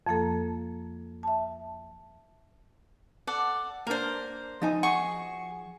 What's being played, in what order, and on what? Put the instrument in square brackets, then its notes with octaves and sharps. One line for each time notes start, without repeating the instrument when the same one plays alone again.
[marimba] F2 F3 A#3 A4
E5 A5
[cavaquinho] A4 D5 F#5
[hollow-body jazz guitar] A#3 D4 [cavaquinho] A#4 C5
[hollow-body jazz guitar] F3 D#4 G#5
[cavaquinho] F#4 G#4 C#6